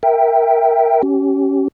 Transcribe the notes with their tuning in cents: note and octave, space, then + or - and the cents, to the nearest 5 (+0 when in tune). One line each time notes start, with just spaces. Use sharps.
A#4 +0 E5 +0 G5 +0
C#4 +0 G4 -35